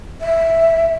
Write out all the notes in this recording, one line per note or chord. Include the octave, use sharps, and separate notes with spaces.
E5